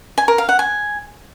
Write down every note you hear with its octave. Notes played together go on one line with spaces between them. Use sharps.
G#5
A#4
F5
F#5
G#5